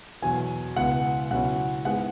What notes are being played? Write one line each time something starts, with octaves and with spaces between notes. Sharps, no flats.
E2 B2 F#3 G#5
C#2 B2 B3 E4 F#5
C#2 B2 F#3 C#4 E4 F#5
G#2 G#3 B3 E4 F#5